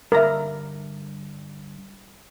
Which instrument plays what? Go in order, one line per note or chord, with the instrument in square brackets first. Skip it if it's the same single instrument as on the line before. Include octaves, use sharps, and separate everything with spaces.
[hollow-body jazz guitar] G2 D3 A#5 [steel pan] A#4 E5